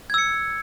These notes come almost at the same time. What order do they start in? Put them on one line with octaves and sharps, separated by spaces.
G#6 E6 C#7